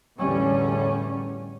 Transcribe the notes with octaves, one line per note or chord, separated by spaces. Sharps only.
A1 E2 D3 G3 C#4